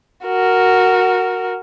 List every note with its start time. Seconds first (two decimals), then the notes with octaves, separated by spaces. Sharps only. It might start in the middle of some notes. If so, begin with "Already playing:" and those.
0.25 F#4 A#4